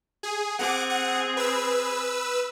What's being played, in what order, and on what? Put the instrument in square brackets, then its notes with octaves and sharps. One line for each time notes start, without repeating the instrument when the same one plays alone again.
[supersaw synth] G#4
[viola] C4 G#4 [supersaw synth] F#5 D6
[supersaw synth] F#5
B4 E6